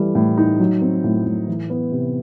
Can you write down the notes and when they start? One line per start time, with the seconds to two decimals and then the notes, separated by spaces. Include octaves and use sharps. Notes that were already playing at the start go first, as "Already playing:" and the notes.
Already playing: E3 G3 A4
0.15 A2
0.37 D#4
0.60 F#3
0.81 C4
1.04 A2
1.26 A2
1.47 E3
1.70 B3
1.92 C3